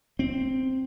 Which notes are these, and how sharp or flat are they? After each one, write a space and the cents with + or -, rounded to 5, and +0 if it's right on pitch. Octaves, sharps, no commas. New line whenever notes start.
C4 +0